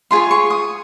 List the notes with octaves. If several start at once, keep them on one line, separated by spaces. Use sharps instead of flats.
F4 G#4 C#5 C6
C#6
D#6